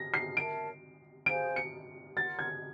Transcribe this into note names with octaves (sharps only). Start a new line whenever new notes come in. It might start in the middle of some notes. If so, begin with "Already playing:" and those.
Already playing: A#6
C7
A#4 C#5 E5 A5 D7
G#4 C5 F5 G#5 D7
C#7
F4 A#4 C#5 F#5 A6
G#6